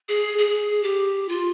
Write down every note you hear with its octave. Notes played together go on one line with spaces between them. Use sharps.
G#4
G#4
G4
F4